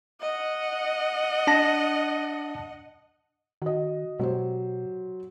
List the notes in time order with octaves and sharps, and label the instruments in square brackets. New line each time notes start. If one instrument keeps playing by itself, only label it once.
[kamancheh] D#5 F#5
[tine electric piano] D4 A5 A#6
[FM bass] D#3 [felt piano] F#4 D#5
[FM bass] B2 [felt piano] F#3 G4 C5